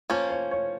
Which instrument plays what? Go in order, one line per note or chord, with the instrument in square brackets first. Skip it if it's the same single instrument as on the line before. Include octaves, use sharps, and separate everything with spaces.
[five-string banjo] F3 A#3 C#4 [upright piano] C#5
[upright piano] C#5
C#5